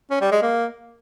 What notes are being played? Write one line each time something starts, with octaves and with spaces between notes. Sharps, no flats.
C#4
G3
G#3
A#3